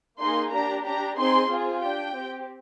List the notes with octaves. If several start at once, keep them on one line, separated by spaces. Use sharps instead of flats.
A#3 D#4 G#4 C6
D4 G4 A#5
D4 G4 A#5
C4 D#4 G#4 C6
C4 F4 G#4
D4 G4 G5
C4 G4